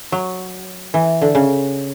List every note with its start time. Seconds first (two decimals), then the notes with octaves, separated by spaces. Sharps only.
0.12 F#3
0.94 E3
1.22 D3
1.35 C#3